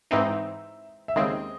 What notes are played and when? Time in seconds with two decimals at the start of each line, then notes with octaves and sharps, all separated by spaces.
0.11 G#2 E3 C4 D#4 E5
1.08 E5
1.16 D#2 C#3 G#3 C4 D#5